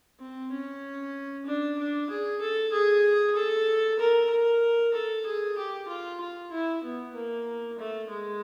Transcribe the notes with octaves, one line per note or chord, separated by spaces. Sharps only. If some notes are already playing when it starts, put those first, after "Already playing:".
C4
C#4
D4
D4
G#4
A4
G#4
A4
A#4
A#4
A4
G#4
G4
F4
F4
E4
B3
A#3
A3
G#3